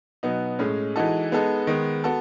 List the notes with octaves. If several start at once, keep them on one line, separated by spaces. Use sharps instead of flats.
B2 F#3 B3 D#4
A2 G#3 C#4
E3 G#3 D#4 F#4 A4
G#3 B3 D#4 A4
D#3 G#3 B3
B3 F#4 A4